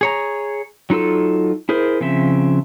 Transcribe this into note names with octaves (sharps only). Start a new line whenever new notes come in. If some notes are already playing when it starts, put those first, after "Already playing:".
G#4 C#5 A#5
F#3 D#4 F4 A4 E6
E4 G#4 A#4 C5
C#3 F3 C4 E5